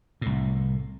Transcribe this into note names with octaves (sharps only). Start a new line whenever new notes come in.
C2 A2